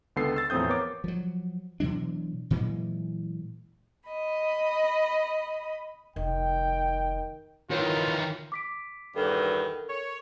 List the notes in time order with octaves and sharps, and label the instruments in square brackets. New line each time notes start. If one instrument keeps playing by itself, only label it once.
[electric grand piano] C#2 D3 B3 A4 C7
E6 A6
E2 A2 F3 C4 D#6 G6
B3 A#4 C#5 D6
[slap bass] F3 F#3
B2 E3 F#3 D4
A#2 E3 F#3 G#3
[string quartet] D#5 B5
[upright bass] F1 [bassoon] D#3 [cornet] G5
[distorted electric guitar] D#3 E3 [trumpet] F4 [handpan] F#4 A#4 C#5
[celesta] D6 B6 D7
[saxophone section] E2 G2 D#3 [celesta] A4 A#4
[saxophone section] C#5